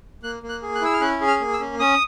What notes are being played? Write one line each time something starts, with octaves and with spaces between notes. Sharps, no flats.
A#3 F#6
A#3
F#6
G#4
F#6
E4 E6
F6
C#4 F#6
G#4
F6
A#3
E6
C#4
C#4 D#6